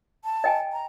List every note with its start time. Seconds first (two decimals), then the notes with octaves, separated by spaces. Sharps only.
0.24 A5
0.44 D#5 G5 G#5
0.73 A#5